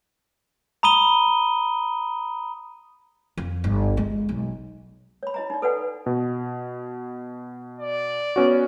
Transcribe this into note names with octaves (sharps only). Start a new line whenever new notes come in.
A#5 B5 D#6 D#7 G7
F2
G1
G#3
B1
C#5 B5
E4 D#5 A#5
D#4 D5
A4 B4 D5 F#5 G#5
B2
D5
B3 C#4 F#4